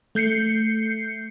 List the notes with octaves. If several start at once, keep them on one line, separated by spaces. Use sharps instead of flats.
A3 G6 C7 C#7